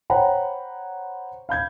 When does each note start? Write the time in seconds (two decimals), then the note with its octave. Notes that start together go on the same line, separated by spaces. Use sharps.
0.10 C5 C#5 F#5 G5 A#5 B5
1.49 F5 B5 G6 G#6